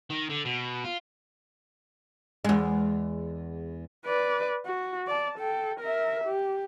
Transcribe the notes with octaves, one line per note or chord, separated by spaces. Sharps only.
D#3
D3
B2
F4
E2 G#3
B4 D5
F#4
D5 A5
A4 G5
A#4 E5
G4